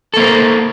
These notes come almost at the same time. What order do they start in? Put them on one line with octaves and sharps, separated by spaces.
A4 A#3 C5 A#4